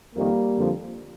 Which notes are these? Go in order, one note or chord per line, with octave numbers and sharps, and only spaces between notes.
F2 D#3 G3 A#3
F2 D3 F3